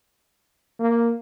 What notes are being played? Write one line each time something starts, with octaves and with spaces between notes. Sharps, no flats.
A#3